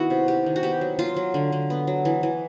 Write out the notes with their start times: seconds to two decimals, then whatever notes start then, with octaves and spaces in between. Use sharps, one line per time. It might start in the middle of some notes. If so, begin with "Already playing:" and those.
Already playing: D#3 B3 E4 F#4
0.10 C3
0.28 C3 G4
0.46 D#3
0.56 F#4
0.63 B3 G4
0.81 F#3
0.99 F#3 F4
1.17 F#3
1.34 D3
1.52 D3
1.70 B3
1.87 F#3
2.05 E3
2.23 E3